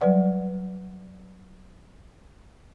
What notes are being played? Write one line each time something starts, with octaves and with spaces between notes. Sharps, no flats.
F#3 G3 B4 D5 F#5